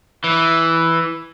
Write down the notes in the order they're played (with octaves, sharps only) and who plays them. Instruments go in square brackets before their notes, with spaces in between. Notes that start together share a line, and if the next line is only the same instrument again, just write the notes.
[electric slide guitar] E3